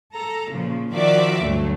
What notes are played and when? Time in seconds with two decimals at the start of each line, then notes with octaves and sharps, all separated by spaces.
0.14 A4 A#5
0.51 A#2 C#3 F3
0.92 D#3 F3 F#4 D5 E5 D6
1.44 D2 G2 F#3 A3